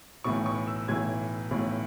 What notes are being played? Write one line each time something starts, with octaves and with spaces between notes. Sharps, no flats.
B1 A2 E3 C#6
C#6
E6
B1 A2 E3 G#6
B1 A2 E3